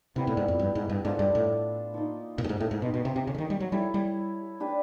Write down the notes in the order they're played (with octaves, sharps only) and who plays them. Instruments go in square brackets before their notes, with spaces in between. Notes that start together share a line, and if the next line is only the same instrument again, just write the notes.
[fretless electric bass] C3 [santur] G3 B3 E4 G4
[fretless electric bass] A2
G#2
F2
G2
G#2
G2
[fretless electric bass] G#2 [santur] D4 F4 A4
[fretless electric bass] G2
A2
[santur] F3 A#3 D#4
[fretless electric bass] A#2
G2
G#2
A2
G#2
[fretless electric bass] B2 [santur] D#4 G4 C5
[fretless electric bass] B2
C3
C3
C#3
D3
D#3
G3
F#3
[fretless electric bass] G3 [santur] E4 A4 C#5
[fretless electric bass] G3
[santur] D4 G4 B4